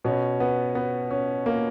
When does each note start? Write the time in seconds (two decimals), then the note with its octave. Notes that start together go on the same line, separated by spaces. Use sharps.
0.05 B2 C#4
0.40 B3
0.75 B3
1.11 C#4
1.46 A#3